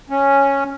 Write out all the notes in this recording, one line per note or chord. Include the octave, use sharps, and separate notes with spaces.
C#4